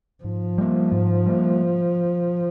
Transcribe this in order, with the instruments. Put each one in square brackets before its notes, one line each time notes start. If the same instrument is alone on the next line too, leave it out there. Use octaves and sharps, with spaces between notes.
[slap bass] G#2 [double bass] F3
[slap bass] G3 A#3
G#2
G3 A#3